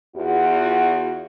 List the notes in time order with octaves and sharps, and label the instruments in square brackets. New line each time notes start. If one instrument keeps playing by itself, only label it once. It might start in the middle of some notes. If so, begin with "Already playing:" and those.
[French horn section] E2 F4 F#4